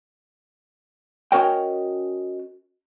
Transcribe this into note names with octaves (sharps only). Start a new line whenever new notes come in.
C#4 F#4 A#4 C#5 D#5 G5